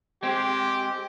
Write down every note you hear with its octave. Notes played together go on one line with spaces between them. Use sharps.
G#3 C4 G4